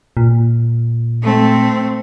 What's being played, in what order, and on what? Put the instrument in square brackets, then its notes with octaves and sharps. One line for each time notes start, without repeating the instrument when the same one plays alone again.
[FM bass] A#2
[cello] A3 C4